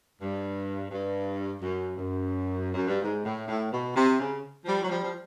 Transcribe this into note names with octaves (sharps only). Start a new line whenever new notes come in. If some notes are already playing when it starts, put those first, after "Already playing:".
G2
G2
F#2
F#2
F#2
G2
G#2
A2
A2
B2
C3
C#3
F3 G3
F#3
F3 G3
F3